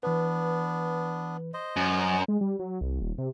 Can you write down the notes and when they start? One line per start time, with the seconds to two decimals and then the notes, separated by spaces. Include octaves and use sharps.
0.03 E3 B3 D4 B4
1.54 C5 D#5
1.76 F#2 C#4
2.28 G#3
2.41 G3
2.59 F#3
2.81 C2
3.02 D#1
3.18 C3